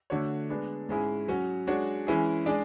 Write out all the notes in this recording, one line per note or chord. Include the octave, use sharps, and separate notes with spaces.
D3 A3 D4 F#4 C#5
G#3 B3 D4
G#2 G#3 C#4 E4 G#4
F#3 C#4 F#4
G#3 D4 F#4 C#5
E3 G#3 C#4 E4 G#4
G#3 D4 G#4 D5